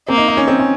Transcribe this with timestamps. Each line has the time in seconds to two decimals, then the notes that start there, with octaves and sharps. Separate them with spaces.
0.08 A#3 C4
0.18 D#4
0.28 D#4
0.37 C#4
0.48 C4
0.59 C#4